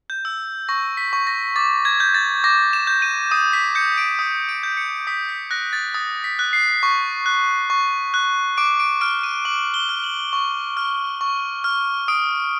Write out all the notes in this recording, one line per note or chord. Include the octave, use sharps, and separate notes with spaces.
G6
E6
C#6 A#6
B6
C#6
A#6
D6 A6
G#6
G6
A6
D6 A#6
E7
G6
D#7
D#6 D#7
B6
G6 C#7
D7
D#6
D7
G6
C#7
D#6 B6
B6
F#6 A#6
A6
D#6 A6
B6
F#6
C7
C#6
F#6
C#6
F#6
D6 D7
D7
F6 D7
D#7
D6 F#7
G7
F6
F#7
C#6
F6
C#6
F6
D#6 D7